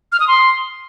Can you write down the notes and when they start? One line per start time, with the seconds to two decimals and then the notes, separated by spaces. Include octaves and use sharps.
0.12 F6
0.20 D#6
0.28 C6